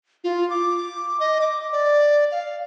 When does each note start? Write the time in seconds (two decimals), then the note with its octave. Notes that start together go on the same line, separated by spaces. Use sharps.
0.24 F4
0.50 D6
1.20 D#5
1.41 D6
1.72 D5
2.32 F5